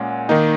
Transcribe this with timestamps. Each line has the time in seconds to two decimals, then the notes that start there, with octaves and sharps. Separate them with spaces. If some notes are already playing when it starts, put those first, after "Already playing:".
Already playing: A#2 G#3 C#4 F#5
0.29 D#3 A#3 D#4